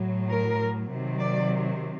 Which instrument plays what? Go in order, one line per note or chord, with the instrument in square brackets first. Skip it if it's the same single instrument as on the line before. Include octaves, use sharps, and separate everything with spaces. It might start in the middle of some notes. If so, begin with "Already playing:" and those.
Already playing: [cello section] A2 F#3
A#4
C3 D#3 F#3
D5